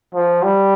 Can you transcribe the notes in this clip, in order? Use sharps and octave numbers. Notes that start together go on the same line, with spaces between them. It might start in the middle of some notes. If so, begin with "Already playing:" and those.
F3
G3